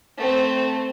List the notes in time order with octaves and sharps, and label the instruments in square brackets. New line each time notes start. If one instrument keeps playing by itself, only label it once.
[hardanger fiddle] A3 C4